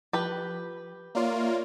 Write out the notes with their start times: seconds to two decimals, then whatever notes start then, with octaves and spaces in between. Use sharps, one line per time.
0.13 F3 G4 B4
1.15 A#3 F4 C#5 D5 E5